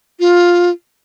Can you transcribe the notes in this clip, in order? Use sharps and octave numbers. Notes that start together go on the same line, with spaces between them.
F4